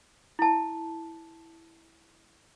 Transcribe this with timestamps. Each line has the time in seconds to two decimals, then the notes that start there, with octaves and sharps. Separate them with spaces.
0.39 E4 A5